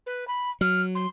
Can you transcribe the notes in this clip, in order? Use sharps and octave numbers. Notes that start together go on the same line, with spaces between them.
B4
B5
F#3 F6
C6